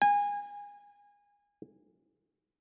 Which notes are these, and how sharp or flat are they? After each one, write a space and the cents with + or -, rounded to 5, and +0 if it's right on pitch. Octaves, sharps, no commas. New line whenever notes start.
G#5 -25